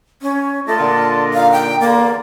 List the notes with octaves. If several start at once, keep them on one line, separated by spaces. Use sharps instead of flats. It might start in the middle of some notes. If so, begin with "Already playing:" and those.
C#4
A3 F4 D5 D#5 A5
A#2 D3
D#4 F5
G5
E2 D3 A#3 D5